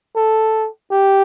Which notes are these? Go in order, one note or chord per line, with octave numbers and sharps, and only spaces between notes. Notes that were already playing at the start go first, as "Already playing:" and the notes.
A4
G4